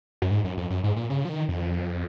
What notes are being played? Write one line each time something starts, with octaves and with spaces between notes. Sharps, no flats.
F#2
G#2
F#2
F2
F#2
G#2
A#2
C#3
F3
D#3
F2